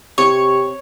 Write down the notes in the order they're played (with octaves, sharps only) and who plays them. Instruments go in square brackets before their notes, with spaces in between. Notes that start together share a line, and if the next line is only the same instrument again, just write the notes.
[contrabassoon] C3 [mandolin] C#5